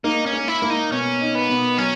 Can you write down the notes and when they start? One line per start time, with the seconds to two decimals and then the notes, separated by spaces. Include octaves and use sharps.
0.04 A#3 D#4
0.26 C#4
0.33 A#3
0.48 E4
0.62 A#3
0.70 D#4
0.92 B2 C#4
1.21 D#4
1.35 B3
1.50 B2
1.78 F#3 C#4